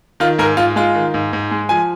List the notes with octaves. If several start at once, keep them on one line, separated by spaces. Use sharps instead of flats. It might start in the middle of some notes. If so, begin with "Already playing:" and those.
D#3 F4
G#2 A#4
G#2 F4
G#3 F4
D#3
G#2
G#2
G#3
F3 G#5